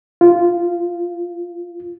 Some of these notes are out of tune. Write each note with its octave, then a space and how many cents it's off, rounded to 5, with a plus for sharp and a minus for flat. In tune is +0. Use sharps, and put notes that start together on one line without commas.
F4 -10